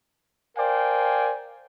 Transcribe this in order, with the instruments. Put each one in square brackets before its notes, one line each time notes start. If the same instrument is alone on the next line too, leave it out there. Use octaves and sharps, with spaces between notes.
[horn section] A#4 C5 D5 F5 G5 G#5